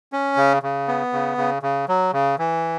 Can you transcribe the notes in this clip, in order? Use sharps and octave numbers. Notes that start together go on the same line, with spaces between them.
C#4
C#3
C#3
B3
C#3
C#3
C#3
F#3
C#3
E3